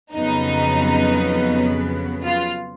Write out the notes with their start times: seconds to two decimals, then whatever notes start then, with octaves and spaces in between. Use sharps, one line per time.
0.12 F2 C#3 F#3 B3 D#4
2.24 F4